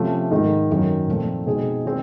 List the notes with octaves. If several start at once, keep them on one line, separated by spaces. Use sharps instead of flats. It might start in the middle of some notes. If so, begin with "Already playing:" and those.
Already playing: C3 F3 A3 C#4 F4
G#2 D#3 G#3
F#2 D#3 F#3
A#2 F3 A3 C4
B2 G#3 C4 D#4 G#4
D#3 G#3 C4